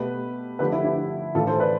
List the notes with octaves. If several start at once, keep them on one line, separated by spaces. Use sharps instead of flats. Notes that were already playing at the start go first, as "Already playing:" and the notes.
Already playing: B2 A3 G4 B4
D3 F3 A3 G4 B4
E4
E4 G4
A2 E3 A3 F4 A4
A4 C5
B4 D5